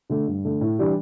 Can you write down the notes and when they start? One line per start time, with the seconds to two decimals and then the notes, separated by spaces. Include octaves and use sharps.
0.10 D3 A3
0.28 G2
0.45 D3 A3
0.61 A2
0.78 E3 G3 D4 G4